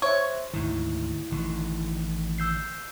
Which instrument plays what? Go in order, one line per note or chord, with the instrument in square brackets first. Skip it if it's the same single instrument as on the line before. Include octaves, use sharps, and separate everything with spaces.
[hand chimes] C5 E5 [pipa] C#5
[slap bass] D2 G#2 D#3 [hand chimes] E4
[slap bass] A1 D3 D#3
[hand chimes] E6 G6 C7